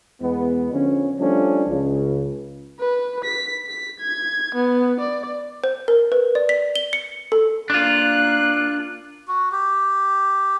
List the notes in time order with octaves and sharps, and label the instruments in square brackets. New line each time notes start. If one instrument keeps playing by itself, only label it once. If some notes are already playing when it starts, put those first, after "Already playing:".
[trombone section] E2 G#3 B3
D3 F3 C#4
F3 G3 A3 C#4 D4
C#2 C#3
[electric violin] B4
B6
B6
G#6
B3
D5
[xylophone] C5
A#4
B4
D5
B6
G7
C#7
A4
[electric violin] A#3 F#6 [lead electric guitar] D4 F4
[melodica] F#4
G4